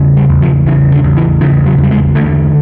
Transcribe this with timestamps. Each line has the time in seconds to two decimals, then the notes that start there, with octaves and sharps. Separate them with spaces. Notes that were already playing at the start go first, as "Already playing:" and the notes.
Already playing: E2 C#3
0.17 G3
0.29 E2
0.42 F3
0.66 C#3 E3
0.92 D3
1.04 E2
1.17 E3
1.41 C#3 F3
1.66 F#3
1.78 E2
1.84 G3
1.91 G#3
2.15 D3 A3